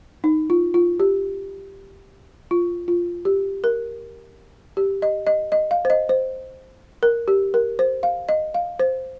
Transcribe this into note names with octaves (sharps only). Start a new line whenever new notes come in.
D#4
F4
F4
G4
F4
F4
G4
A#4
G4
D#5
D#5
D#5
F5
C5
D#5
C5
A#4
G4
A#4
C5
F5
D#5
F5
C5